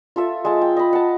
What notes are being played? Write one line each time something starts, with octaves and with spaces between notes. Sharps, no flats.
F4 A4 E5
G#3 A5
G5
D#5 B5
F#5 A5